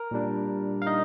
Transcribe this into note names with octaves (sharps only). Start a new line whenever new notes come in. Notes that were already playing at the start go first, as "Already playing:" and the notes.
Already playing: A#4
A#2 G3 D4
F5
D#4 D#5